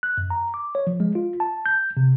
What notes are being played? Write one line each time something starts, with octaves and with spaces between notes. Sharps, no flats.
F#6
F#2
A#5
D6
C#5
F3
G#3
F4
A5
G6
C3